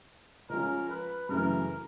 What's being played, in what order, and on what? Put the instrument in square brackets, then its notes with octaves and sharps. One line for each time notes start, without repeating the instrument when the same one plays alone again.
[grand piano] F3 G#3 C#4 F4 [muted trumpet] A#4
[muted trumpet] B4
[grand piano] F#2 C#3 E3 A3 [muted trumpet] A#4